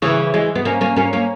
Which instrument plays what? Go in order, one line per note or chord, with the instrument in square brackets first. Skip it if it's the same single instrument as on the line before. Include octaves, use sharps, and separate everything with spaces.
[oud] C#3 E3
E3 G#3
B3
A#3 C#4
A#3 C#4
A#3 C#4
A#3 C#4